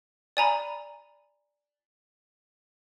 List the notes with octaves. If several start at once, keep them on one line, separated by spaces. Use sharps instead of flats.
D5 G#5 A#5 B5